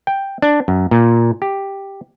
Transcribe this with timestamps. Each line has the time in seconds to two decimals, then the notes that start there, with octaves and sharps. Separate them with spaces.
0.07 G5
0.42 D4
0.68 F#2
0.91 A#2
1.42 G4